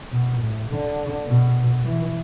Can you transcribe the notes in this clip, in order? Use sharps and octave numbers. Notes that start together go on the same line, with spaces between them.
B2
A2
D3
B2
E3